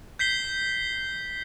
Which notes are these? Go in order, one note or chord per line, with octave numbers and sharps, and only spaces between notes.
G6 B6 C7 G7